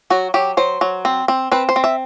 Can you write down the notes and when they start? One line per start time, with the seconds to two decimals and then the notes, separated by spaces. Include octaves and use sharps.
0.10 F#3 F#4
0.34 F#3 G4
0.57 F#3 C5
0.81 F#3
1.05 C4
1.28 C4
1.52 C4 B4
1.69 C5
1.76 C4
1.84 E5